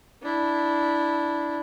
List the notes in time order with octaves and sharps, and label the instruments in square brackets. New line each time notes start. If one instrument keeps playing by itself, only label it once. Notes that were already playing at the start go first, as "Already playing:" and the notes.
[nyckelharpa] D4 E4